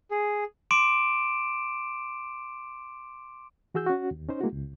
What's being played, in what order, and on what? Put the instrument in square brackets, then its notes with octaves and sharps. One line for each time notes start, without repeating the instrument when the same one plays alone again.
[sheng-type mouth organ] G#4
[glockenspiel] C6 D6 D7 E7
[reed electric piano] E3 F#4 G#4 E6 G6
C#4 F#4
D#2
C#4 D#4 C5
G#3 A#3 E4 F#4
C#2